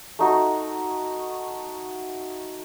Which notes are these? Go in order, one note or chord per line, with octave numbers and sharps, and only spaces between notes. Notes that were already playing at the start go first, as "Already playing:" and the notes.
A3 D#4 F#4